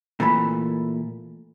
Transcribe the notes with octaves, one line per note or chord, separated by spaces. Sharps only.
A#2 E3 A3 B5